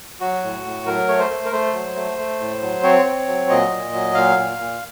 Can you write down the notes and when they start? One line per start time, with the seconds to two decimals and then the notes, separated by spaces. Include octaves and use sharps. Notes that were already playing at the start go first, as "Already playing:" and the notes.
0.21 F#3 F#4
0.43 A2
0.65 A2
0.86 F#3 A#4
1.08 A3 C#5
1.19 C5
1.30 A3
1.45 A#4
1.52 A3 C5
1.74 F#3
1.96 A3
2.18 A3
2.40 A2
2.62 F#3
2.83 C4 C#5
3.05 C4
3.27 F#3
3.50 A#2 D#5
3.71 A#2
3.93 F#3
4.15 A#2 F5
4.37 A#2
4.59 A#2